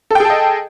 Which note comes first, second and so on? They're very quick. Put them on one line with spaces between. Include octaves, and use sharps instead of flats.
A4 G5 G#4 A5 D#5